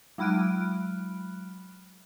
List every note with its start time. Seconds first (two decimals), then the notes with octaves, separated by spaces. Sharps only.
0.18 F#3 G#3 B5 F6 F#6 D7